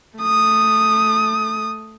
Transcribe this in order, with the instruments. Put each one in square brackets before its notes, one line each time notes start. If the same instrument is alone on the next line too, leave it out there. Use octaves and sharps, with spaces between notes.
[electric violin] A3 D#6